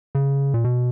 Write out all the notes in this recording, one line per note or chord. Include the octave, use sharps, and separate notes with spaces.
C#3
A#2
B2